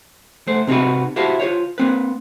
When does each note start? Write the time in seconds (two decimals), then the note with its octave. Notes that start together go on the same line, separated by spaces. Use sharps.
0.47 A3 C5
0.67 C3 C4 D#4 F#4 B4
1.16 E4 F#4 G4 C5 F5 A5
1.40 F4 G4 C5 C#5
1.78 A#3 C4 B4